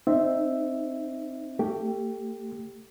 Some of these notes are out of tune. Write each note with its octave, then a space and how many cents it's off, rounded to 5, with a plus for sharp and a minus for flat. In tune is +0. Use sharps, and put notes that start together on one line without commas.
C4 +0 D#4 -20 E5 +0
A3 +25 G4 +0